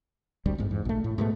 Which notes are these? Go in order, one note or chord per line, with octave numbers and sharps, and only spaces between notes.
D1 G#1 D2 G3
G1 G#2
E2 G#2
A#1 A3
A2
G#2 B2 A3